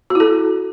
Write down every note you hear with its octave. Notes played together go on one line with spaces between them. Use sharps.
E4 F#4 A4